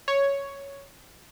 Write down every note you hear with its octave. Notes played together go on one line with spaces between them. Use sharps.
C#5